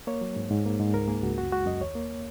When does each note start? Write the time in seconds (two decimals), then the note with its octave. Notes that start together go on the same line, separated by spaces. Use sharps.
0.07 A#3 C#5
0.21 F#3
0.36 G#2
0.51 G#2
0.65 A#3
0.79 G#2
0.94 C#2 A#4
1.08 A#3 G#4
1.23 C#2 F#4
1.38 F#2 F#4
1.52 G#3 F#4
1.66 F#2 D#5
1.81 D#2 C#5
1.95 A#3